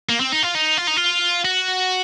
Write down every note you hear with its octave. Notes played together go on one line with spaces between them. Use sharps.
A#3
C4
D#4
F4
D#4
F4
D#4
F4
F#4